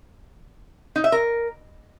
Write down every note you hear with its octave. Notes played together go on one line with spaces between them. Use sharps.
D#4
E5
A#4